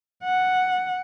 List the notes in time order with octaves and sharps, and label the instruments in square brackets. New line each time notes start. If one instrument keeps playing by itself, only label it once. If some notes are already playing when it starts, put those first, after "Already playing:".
[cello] F#5